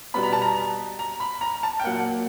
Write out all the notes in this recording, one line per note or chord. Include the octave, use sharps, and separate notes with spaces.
B2 G3 B3 B5
A#5
A5
A#5
A#5
B5
A#5
A5
G5
A#2 F#3 A#3 F#5